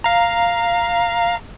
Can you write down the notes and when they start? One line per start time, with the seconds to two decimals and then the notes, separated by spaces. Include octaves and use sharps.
0.04 F5 A#5